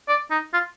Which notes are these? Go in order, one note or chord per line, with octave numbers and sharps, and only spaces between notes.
D5
D#4
F4